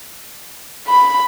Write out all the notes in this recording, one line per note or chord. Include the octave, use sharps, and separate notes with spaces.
B5